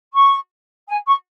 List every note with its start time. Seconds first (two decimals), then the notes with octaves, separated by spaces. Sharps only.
0.13 C#6
0.87 G#5
1.06 C#6